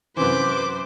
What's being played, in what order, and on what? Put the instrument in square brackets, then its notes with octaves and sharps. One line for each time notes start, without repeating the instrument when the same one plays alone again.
[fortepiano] F#2 C3 E3 [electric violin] B4 D6 [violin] C5